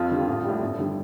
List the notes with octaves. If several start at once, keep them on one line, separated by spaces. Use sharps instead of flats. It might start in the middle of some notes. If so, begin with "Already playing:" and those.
Already playing: F2 F4
D3 G3
A1
A2 G3
G1
D3 G3